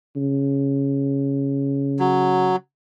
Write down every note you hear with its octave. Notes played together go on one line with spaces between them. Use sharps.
C#3
F#3